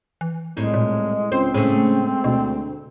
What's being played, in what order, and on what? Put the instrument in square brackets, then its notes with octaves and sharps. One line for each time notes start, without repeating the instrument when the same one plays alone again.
[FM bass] E3
[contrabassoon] C2 [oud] A2 D#4 [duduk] G#3
[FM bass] A#2
[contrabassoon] C#2 [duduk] C4 [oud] C5
[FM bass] A2 [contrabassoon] C#3 [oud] G#3 A3
[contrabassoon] D2 [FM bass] B2